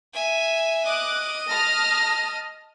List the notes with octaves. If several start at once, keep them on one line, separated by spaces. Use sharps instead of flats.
E5 G#5
D#5 D6 F#6
A5 F6 A#6